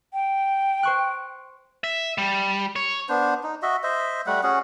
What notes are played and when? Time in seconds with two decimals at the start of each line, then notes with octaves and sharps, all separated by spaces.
0.13 G5
0.83 C5 C#6 F#6
1.84 E5
2.18 G3
2.76 C#5
3.09 B3 D4 C5
3.43 D#4
3.62 F#4 D#5 E5
3.83 C5 D#5 E5
4.27 G3 A3 F#5
4.43 C#4 F#4 G#4 F#5